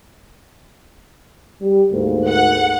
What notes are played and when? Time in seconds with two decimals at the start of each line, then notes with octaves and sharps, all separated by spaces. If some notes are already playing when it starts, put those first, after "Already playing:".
1.61 G3
1.92 D2 G#2 A#3
2.28 F#5